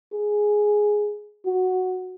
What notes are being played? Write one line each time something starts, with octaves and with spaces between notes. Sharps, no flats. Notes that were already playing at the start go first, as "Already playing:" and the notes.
G#4
F#4